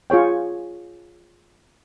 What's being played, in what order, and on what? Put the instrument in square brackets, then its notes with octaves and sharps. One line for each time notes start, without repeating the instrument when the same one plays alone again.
[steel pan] F4 G#4 C#5 G5